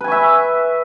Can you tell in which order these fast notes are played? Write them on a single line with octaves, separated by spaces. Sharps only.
B4 G#5 C#6 E5